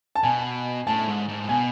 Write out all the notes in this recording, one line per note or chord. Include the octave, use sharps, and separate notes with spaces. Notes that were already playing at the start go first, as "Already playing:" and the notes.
A5
B2 G#5
A2 A5
G#2
G#2
A2
B2 G#5